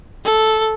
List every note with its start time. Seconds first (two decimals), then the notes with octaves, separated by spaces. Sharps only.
0.24 A4